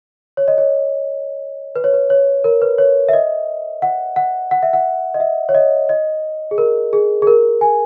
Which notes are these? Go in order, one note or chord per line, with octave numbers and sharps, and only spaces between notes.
C#5
D#5
C#5
B4
C#5
B4
C#5
A#4
B4
C#5
E5
D#5
F#5
F#5
F#5
E5
F#5
D#5
E5
C#5
D#5
D#5
G#4
A#4
G#4
G#4
A#4
G#5